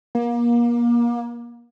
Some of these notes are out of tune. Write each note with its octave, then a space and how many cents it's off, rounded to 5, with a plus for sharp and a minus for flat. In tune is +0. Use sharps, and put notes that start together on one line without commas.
A#3 +30